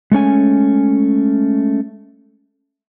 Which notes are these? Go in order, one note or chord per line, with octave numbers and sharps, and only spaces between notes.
G#3 A3 C#4 G#5